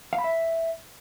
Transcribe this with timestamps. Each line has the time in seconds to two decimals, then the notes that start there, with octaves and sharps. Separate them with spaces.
0.13 F5
0.18 B5
0.24 E5